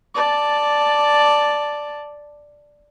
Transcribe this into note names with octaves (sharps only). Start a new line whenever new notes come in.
D5 A5